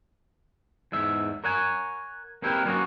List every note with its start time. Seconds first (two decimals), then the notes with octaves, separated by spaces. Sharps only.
0.92 E2 G#2 E5
1.44 A#4 C#5 F#5 G#5
2.42 A#3 C4 E4 G4 A#4 B4
2.65 F#3 G3 A#3 B3 C#4 F#4